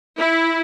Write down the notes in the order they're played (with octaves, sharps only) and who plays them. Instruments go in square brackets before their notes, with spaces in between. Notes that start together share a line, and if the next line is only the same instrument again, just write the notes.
[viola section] E4